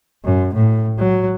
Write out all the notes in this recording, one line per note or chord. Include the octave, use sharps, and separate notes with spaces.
F#2
A2
F#3